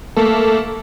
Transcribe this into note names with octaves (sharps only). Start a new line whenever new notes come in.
A3 A#3 A4